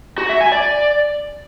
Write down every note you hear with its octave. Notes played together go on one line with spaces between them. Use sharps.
F#4
E5
G#5
D5